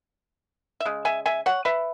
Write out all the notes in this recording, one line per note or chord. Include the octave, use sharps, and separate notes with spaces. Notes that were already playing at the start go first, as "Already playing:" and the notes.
E5
C#3 G#3
E5 G#5
E5 G#5
C#5 F#5
B4 E5